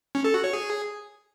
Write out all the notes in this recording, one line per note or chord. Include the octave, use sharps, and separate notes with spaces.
C#4
A4
F#4
C#5
G#4